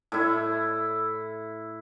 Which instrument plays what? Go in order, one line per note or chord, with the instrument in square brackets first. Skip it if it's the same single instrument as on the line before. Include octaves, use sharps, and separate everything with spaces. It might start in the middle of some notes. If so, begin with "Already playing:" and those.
[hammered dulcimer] A2 E4